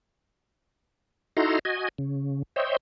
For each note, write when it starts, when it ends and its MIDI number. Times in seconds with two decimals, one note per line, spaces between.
1.37 1.59 63
1.37 1.59 64
1.37 1.59 66
1.37 1.59 69
1.37 1.59 82
1.37 1.59 84
1.65 1.88 66
1.65 1.88 75
1.65 1.88 80
1.98 2.43 49
2.56 2.77 72
2.56 2.77 73
2.56 2.77 75
2.56 2.77 76
2.56 2.77 79